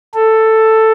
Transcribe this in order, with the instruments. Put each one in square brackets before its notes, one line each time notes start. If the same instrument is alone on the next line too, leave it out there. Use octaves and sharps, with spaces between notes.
[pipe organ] A4